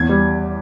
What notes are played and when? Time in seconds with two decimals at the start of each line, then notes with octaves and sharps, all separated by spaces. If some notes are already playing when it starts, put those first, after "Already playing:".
Already playing: E2 G#6
0.09 G3